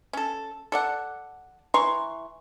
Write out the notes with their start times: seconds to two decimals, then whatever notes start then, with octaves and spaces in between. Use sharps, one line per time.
0.13 C#4 A4
0.72 A4 D5 F#5
1.74 E3 A#5 C6 C#6